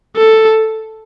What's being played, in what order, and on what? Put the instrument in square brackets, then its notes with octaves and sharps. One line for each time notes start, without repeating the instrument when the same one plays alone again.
[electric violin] A4